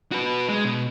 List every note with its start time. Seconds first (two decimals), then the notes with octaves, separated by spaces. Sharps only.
0.12 F#4 B4
0.49 G#3
0.65 B2